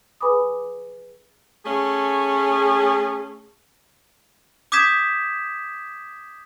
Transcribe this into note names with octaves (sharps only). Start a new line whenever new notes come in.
G#4 B4 G#5 B5 D6 D#6
A3 C#4 G#4
D6 D#6 G6 G#6 B6 E7